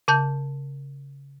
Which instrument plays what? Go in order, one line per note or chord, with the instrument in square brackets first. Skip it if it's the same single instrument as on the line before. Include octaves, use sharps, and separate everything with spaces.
[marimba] C#3 A5 G6